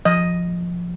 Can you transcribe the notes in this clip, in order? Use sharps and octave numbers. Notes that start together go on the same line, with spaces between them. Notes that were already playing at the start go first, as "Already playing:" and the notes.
F3 D#5